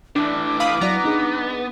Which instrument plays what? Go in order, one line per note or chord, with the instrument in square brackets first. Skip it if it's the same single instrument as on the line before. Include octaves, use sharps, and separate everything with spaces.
[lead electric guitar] A2 E3 [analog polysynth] D4 [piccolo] D6
[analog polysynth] F5 B5 D#6
[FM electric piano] F#3 E4 D5 [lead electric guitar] B3 [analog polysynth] A#5
[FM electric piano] D4 D#4 G#4